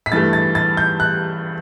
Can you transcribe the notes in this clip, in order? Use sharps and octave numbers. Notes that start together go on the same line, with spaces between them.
B6
G2 E3 A3 A6
A6
A6
G6
F#6